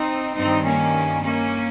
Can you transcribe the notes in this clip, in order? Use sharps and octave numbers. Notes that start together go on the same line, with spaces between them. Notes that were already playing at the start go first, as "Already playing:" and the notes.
Already playing: C4 D#4
G2 D#3 C4 D#4
A#3 C#4
A#3 C#4